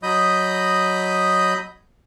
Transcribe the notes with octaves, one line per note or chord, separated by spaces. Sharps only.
F#3 D#5 B5 D#6 G6